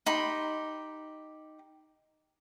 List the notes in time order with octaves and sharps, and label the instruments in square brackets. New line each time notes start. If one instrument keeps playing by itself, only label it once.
[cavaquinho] D#4 G4 B5 C6